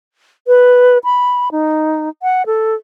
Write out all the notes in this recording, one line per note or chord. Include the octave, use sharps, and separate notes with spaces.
B4
B5
D#4
F#5
A4